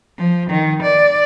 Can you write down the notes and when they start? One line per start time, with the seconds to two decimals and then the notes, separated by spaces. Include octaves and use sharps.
0.18 F3
0.50 D#3
0.82 D5